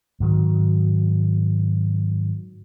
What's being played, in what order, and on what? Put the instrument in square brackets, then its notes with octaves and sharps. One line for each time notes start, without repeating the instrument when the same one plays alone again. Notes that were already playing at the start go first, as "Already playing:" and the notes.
[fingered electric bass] G#2 D#3 F#3